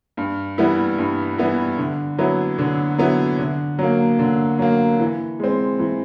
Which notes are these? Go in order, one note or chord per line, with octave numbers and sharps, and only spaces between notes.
G2
E3 G3 B3 E4
G2
E3 G3 B3 E4
D3
F#3 B3 E4
D3
F#3 B3 E4
D3
F#3 A#3
D3
F#3 A#3
E3
G#3 C4
E3